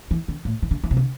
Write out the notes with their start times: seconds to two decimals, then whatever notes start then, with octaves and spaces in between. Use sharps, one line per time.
0.11 E3
0.28 D3
0.45 A2
0.62 E3
0.71 D3
0.84 E3
0.91 C3
0.97 D3